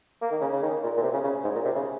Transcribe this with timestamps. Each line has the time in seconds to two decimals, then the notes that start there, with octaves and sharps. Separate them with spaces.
0.22 A#3
0.31 D#3
0.41 C#3
0.53 C#3
0.62 D#3
0.83 A#2
0.97 A#2
1.03 C3
1.13 C#3
1.24 C#3
1.44 G#2
1.55 A#2
1.65 C3
1.75 C#3